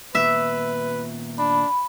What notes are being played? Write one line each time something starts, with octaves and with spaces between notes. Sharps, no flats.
A#2 D#3 B3 B4 E5
D4 B5